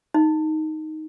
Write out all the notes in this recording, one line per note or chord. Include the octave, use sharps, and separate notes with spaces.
D#4